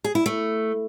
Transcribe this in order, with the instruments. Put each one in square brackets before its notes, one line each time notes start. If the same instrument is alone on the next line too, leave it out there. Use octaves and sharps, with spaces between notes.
[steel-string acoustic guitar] G#4
E4
A3